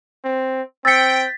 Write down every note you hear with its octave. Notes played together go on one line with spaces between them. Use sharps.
C4
C4 G5 E6 A6 B6 C#7